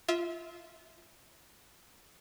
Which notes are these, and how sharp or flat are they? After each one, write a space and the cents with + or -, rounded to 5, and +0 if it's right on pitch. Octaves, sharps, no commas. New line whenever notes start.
F4 -15 E5 -30